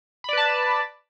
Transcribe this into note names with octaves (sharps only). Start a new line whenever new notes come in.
B4 D5 A5 B5